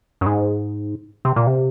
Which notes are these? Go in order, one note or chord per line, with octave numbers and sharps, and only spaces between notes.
F#2
G#2
C3
A#2
C3